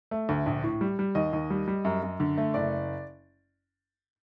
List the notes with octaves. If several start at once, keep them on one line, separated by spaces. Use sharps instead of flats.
A3
D2
A#1
A2
G3
G3
D#2 D#5
D#2
G3
G3
F#2
F#2
D3
A3
F#1 D5